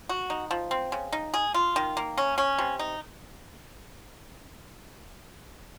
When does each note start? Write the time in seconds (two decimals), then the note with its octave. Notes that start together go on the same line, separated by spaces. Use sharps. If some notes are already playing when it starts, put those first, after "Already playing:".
0.09 F#4
0.30 D#4
0.51 F3
0.71 C4
0.92 C#3
1.12 D#4
1.34 G#4
1.54 F4
1.76 D#3
1.97 A#3
2.18 C#4
2.38 C#4
2.59 C3
2.79 D#4